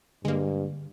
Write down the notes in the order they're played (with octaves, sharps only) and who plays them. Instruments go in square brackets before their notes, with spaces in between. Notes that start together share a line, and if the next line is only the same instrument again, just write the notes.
[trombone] G2 [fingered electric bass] D3 [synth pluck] G#3 A#3